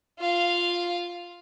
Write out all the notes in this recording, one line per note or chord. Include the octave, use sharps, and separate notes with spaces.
F4 F5